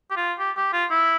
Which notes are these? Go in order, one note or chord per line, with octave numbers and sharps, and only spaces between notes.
G4
F4
G4
G4
F4
E4